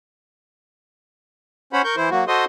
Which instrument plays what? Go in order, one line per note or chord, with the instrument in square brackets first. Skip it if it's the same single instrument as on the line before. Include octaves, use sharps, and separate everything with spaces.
[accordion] C#4 C5 C#5 F#5 B5
A#4 C#6 G6
E3 E4 C5
F#3 A#3 F#4
F#4 A4 C5 D#5 C6 D#6